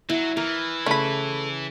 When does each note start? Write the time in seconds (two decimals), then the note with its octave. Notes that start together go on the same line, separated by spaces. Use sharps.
0.09 F#3 E4
0.37 E3 A#4
0.86 C#3 A3 B5